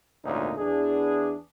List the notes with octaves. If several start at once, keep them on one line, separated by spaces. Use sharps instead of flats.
G#1 D2 A#2 A#3 C#4 D#4
E2 D4 G#4